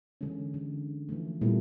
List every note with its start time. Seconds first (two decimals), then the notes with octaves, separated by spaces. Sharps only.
0.21 D3 E3 G#3 C#4
0.54 D3
1.09 E3 F3 A3
1.41 A#2 G3 A3 B3 E4 A4